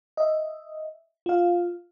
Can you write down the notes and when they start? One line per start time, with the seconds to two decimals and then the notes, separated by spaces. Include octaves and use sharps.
0.17 D#5 E5
1.26 F4 F5